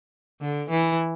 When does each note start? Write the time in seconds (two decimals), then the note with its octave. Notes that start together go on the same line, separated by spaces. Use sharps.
0.41 D3
0.70 E3